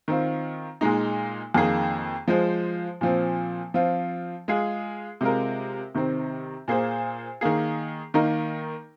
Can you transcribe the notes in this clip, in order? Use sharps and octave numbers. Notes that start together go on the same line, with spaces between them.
D#3 C4 F4
A#2 G#3 D#4
F2 D#3 A#3 G#4
F3 G#3 F4 C5
A#2 F3 C4
F3 C4 F4
G#3 F4 G#4
C3 G#3 F4 A#4
C3 D#3 C4
A#2 A#3 G#4 C5
D#3 A#3 G#4
D#3 A#3 D#4 A#4